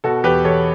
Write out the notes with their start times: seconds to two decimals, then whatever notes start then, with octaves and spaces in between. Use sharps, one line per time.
0.04 B2 F#4 A4
0.24 E2 G4 B4
0.44 E2 A4 C#5